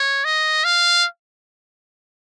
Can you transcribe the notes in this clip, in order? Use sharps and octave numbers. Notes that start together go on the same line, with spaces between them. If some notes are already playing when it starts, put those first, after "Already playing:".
Already playing: C#5
D#5
F5